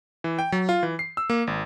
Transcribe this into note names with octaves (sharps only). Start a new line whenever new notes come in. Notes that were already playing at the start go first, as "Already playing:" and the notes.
E3
G5
F#3
F4
E3
C7
E6
A#3
G#1